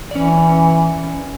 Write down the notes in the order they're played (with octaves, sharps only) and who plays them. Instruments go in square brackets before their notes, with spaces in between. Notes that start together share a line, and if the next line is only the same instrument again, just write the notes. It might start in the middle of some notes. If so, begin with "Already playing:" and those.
[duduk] E3 [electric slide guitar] C#4 D5